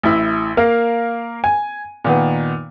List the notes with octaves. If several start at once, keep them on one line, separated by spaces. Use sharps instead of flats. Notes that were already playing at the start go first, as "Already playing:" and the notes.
A1 E4
A#3 A#4 F5
G#5
A#2 D#3 B3